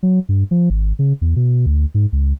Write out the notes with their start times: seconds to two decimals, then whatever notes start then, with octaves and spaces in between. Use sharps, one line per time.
0.03 F#3
0.29 G2
0.51 F3
0.70 G#1
0.99 C#3
1.21 E2
1.36 B2
1.66 D2
1.94 G#2
2.12 C#2